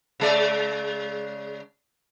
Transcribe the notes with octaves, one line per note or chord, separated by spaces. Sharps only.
C#3 G#3 D5